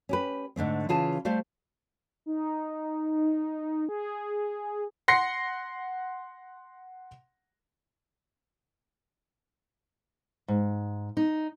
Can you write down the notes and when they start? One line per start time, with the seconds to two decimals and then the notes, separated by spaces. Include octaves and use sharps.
0.09 C#4 G4 B4
0.56 G#2 D3 A3 C4
0.89 C#3 E3 F4 G#4 G#5 A5
1.25 G3 A3 C5 F5
2.26 D#4
3.89 G#4
5.08 F#5 C6 A#6 C7 C#7
10.48 G#2
11.17 D#4